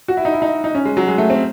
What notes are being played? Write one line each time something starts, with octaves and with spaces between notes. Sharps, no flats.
F#4
E4
D#4
E4
D#4
D#4
C#4
G#3
F#3
G#3
A3
C4